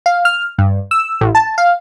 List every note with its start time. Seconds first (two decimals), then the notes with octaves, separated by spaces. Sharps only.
0.06 F5
0.25 F6
0.58 G2
0.91 E6
1.21 A1
1.35 A5
1.58 F5